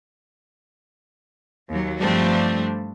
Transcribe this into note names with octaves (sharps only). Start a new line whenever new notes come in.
D#2 F#3
G2 F3 G3 A3 C4 D4